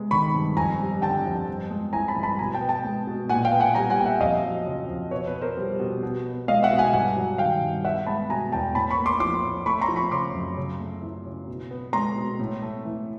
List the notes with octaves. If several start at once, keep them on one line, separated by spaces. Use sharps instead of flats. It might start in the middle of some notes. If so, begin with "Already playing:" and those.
Already playing: C3 G#3 B3
D#3 B5 C#6
G2
F2 G#5 A#5
G3
D3 G5 A5
F2
G2
G#3
E3 G#5 A#5
A5 B5
G2
A5 B5
B2 G#5 A#5
G5 A5
B3
G5 A5
G#3
B2
A#2 F#5 G#5
F5 G5
B3
F#5 G#5
G3 G#5 A#5
F#5 G#5
A#2 G5
E5 F#5
F2 D#5 F5
F#3
C#3
F2
B2 B4 C#5
B4 C#5
B3
A#4 C5
G3
B2
B2
B3
G#3 D#5 F5
E5 F#5
B2
F#5 G#5
G2 F#5 G#5
F#3
D#3 F5 G5
G2
B3 E5 F#5
G#3 A5 B5
B2 G#5 A#5
E2 G5 A5
A2 A5 B5
B5 C#6
A#3
C6 D6
F3 C6 D6
A2
A3 B5 C#6
A#5 C6
F3
B5 C#6
C#3 C6 D6
F#2
C#3
A3
E3
C#3
B2
B3
G#3 A#5 C6
B2
A2
A3
E3